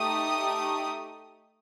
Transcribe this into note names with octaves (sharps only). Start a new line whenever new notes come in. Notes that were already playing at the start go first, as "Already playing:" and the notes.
Already playing: A3 D#4 G4 D#6